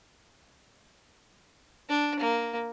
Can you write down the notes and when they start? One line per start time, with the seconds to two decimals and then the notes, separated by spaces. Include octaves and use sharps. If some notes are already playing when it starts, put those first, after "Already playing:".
1.89 D4
2.20 A#3